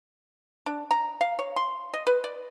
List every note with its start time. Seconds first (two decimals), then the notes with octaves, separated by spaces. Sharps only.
0.66 D4
0.91 A#5
1.21 F5
1.39 C#5
1.56 C6
1.94 D#5
2.07 B4
2.24 D5